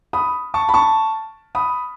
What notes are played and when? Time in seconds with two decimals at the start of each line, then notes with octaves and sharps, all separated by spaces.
0.13 B5 D#6
0.54 A5 C#6
0.69 B5
0.74 A5 C#6
1.55 B5 D#6